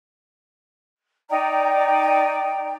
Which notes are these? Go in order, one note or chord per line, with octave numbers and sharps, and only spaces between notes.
D#4 D5 G5 A#5